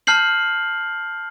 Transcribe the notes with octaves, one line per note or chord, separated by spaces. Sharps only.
A5 F6 G6 C7 F#7